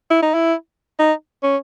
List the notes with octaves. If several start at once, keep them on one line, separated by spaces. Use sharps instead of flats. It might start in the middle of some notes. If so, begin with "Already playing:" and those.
E4
D#4
E4
D#4
C#4